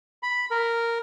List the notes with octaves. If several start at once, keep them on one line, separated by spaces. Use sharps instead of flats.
B5
A#4